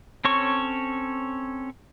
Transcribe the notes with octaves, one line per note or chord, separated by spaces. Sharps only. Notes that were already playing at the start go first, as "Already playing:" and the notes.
C4 C#4 A4 C#5 C#6